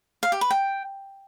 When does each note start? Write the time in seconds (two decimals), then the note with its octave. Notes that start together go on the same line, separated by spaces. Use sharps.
0.23 F5
0.32 G4
0.41 B4
0.51 G5